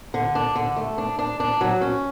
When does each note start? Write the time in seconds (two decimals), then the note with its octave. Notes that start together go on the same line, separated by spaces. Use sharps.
0.14 D3
0.35 D4
0.55 D3
0.76 A3
0.98 D4
1.19 D4
1.40 D4
1.61 F#3
1.81 C#4